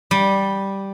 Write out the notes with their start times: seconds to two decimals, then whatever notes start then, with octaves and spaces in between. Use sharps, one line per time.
0.11 G3